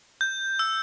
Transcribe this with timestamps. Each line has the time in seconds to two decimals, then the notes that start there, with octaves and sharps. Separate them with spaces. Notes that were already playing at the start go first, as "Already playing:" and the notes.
0.21 G6
0.59 E6